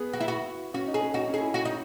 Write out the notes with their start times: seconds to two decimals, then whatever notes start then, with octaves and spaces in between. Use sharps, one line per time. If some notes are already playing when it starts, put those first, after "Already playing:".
Already playing: B3 G#4 B4
0.13 F#4
0.21 E4
0.28 F#4
0.74 C#4 F#4
0.88 D#4
0.94 G#4
1.01 C#4
1.14 D#4 F#4
1.28 C#4
1.34 G#4
1.41 E4
1.54 F#4
1.65 D#4